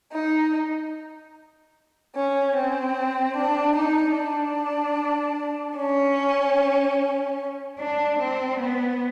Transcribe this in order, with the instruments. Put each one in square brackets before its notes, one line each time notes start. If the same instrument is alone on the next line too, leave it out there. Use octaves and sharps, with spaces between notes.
[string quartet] D#4
C#4
C4
D4
D#4
D4
C#4
D4
C4
B3